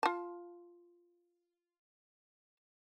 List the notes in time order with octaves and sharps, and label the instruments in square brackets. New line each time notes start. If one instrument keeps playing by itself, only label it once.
[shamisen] F4 A5